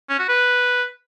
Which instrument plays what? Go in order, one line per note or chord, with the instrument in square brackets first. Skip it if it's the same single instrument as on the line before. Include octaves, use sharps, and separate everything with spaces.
[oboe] C#4
F#4
B4